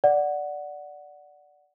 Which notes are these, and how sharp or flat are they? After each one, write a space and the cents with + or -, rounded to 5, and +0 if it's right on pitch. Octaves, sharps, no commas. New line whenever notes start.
D5 +0 F#5 +0